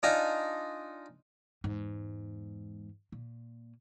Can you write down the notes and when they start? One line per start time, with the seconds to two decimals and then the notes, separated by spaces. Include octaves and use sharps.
0.03 D4 D#4 F4 D#5 G#5
1.64 E2 G#2
3.12 A#2